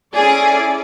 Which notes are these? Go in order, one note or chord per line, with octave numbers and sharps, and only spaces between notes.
C#4 E4 G#4 A4 D5